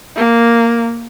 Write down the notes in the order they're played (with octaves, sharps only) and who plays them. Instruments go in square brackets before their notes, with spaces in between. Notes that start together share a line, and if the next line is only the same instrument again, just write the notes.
[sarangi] A#3